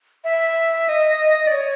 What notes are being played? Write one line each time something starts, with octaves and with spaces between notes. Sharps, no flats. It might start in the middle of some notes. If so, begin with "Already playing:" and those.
E5
D#5
D5
C#5